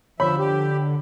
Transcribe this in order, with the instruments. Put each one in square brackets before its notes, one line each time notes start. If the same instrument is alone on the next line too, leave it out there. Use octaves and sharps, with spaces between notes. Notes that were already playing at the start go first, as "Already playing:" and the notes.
[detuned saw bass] D3 [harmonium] F3 E5 [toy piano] C#5 [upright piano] B5
[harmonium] G4